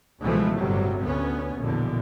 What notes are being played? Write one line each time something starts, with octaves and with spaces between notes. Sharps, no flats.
C#2 B2 E3 F3 G#3 A3
G1 A2 C3 F#3 G3
D2 B3 C#4
A#1 E2 B2 D3